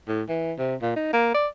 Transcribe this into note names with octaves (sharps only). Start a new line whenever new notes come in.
A2
E3
C3
A#2
D#4
A#3
D5